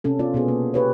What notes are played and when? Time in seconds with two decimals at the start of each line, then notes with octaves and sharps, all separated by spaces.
0.04 C3 C#4 A4
0.19 B3 F4 D5
0.34 B2 B3 G#4
0.48 A#3 C4
0.74 G4 B4 C#5